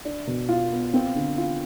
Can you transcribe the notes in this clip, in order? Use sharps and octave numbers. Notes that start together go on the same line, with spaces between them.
D4
B2
F4
B3
C4
D3
F4